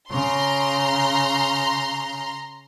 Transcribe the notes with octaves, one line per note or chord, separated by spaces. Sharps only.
C#3 A#5 C6